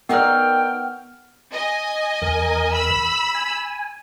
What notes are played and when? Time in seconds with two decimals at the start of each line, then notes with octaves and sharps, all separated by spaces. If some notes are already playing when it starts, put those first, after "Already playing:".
0.09 B3 D#4 A#4 D5 G5 F6
1.52 D#5 G#5
2.22 E2 A#4
2.73 B5 E6
3.35 G#5